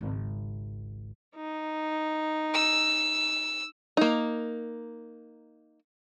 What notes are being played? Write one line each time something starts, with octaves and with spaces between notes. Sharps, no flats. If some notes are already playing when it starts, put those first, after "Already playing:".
G#1 C#2
D#4
E6
A#3 D#4